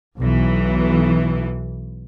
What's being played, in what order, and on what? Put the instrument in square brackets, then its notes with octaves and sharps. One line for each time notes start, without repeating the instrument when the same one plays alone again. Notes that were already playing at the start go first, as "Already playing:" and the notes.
[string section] B1 E3